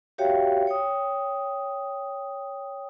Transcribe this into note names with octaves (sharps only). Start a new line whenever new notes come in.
F#4 G4 C#5 E5 F5 G5
C#5 G5 D#6